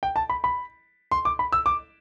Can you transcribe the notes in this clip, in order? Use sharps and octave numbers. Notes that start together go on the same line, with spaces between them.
G5
A5
B5
B5
C6
D6
B5
E6
D6